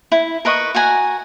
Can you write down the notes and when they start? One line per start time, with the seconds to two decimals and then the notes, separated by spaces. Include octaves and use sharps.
0.12 E4
0.45 A#4 B4 D#5 C#6
0.75 F#4 F#5 G#5 A#5